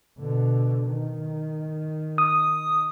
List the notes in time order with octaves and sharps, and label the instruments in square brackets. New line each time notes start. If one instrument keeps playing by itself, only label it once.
[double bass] B2 D3
D#3
[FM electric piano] D#6